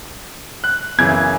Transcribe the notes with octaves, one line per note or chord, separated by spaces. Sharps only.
F#6
F#2 C#3 E3 G#6